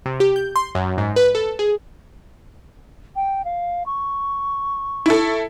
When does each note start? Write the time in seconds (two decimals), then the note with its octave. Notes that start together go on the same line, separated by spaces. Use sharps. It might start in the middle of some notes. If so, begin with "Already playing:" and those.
0.06 C3
0.20 G4
0.36 G6
0.56 C6
0.75 F#2
0.98 G#2
1.16 B4
1.35 A4
1.59 G#4
3.16 G5
3.45 F5
3.86 C#6
5.06 E4 A4